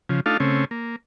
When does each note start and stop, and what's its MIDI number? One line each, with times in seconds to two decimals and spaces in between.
0.09 0.20 49
0.09 0.20 53
0.26 0.37 57
0.26 0.37 62
0.26 0.37 63
0.26 0.37 65
0.26 0.37 69
0.26 0.37 77
0.40 0.65 49
0.40 0.65 57
0.40 0.65 60
0.40 0.65 61
0.71 0.96 58